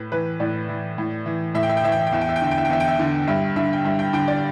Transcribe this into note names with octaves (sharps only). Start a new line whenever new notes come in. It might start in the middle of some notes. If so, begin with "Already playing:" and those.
Already playing: A2 B4
E3 B4
A2 D5
E3
A2
E3
A2 E5
G5
E5
G5
E3 E5
G5
E5
G5
E2 E5
G5
E5
G5
D3 E5
G5
E5
G5
E2 E5
G5
E5
D3
G2 E5
D3 E5
G5
G2 E5
G5
D3 G5
D5